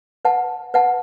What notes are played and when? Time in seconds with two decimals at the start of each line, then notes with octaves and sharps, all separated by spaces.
0.25 B4 F#5 A5
0.74 B4 F#5 A5